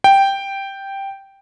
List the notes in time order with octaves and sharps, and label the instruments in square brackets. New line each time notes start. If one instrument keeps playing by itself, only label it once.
[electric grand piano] G5